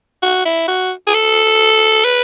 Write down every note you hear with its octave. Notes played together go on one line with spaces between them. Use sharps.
F#4
E4
F#4
G#4
A4
B4